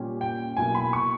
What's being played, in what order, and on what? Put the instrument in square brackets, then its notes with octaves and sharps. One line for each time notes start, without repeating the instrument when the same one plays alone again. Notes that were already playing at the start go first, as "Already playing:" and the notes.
Already playing: [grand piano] A#2 G3 C#4
G5
B1 B2 A#3 E4 G#5
B5
C#6